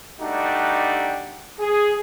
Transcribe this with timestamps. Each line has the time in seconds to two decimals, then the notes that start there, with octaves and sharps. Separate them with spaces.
0.20 G3 A3 D4 D#4 F#4 G4
1.60 G#4